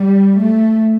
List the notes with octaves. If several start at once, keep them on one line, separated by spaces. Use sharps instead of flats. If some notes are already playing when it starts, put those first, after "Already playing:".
Already playing: G3
A3